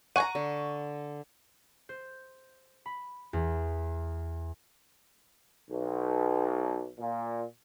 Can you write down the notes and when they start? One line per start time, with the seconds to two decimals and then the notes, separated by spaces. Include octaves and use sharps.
0.16 F#5 G#5 A#5 C#6 D#7
0.35 D3
1.89 C5
2.86 B5
3.33 E2
5.69 B1
6.98 A#2